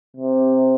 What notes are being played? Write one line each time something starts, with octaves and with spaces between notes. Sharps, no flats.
C3